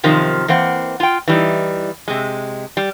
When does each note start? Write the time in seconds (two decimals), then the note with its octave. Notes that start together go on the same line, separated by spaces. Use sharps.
0.03 F#2 C3 D#3 F3
0.48 E3 A#3 C4 F#5
1.00 F4 G5
1.28 E3 G3 D#4
2.08 C3 G#3
2.77 G3